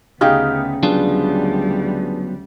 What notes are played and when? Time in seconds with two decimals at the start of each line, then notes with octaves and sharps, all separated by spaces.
0.21 D2 C#3 B3 D#4 G4 G#4 G5 F6
0.83 D2 F#3 G3 B3 D4 F4 G#4 B4